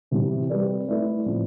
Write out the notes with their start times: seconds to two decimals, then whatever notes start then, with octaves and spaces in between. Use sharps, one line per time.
0.11 C3 E3 G3 C4
0.49 G3 C4 G4 B4 D5
0.88 A3 E4 B4 D5
1.26 A2 F3 C4